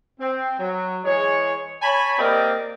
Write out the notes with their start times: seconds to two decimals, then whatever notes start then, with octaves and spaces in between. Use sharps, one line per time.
0.20 C4
0.59 F#3
1.05 E3 G#3 G#4 C#5
1.82 C#5 G#5 A5 B5
2.19 A#3 C4 G4 A#4 D5 D#5